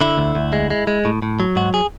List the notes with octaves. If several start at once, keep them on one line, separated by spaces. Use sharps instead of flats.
D3 E4
D2
D2
G#3
G#3
G#3
A2
A2
F#3
G#2 F#4
G#4